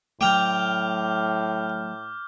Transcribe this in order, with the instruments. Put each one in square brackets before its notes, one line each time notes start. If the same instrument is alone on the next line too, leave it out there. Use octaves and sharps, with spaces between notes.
[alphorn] A2 [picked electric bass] F#3 A3 [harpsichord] G5 A#5 [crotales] D6 F6 G6